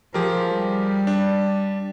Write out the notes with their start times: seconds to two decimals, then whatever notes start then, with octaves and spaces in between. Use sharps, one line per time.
0.14 F3 G4 G#4 A#4
0.52 G3
1.07 D4